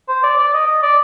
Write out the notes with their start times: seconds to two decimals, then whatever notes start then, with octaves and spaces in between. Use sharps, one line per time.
0.08 C5
0.23 D5
0.38 D5
0.53 D#5
0.67 D#5
0.83 D5